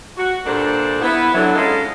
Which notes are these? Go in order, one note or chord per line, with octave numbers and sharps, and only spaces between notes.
F#4
G2 A#2 A#3 D4 A4 C5
B3 E4
D3 E3 F#3
G#3 C#4 D#4 F4 A4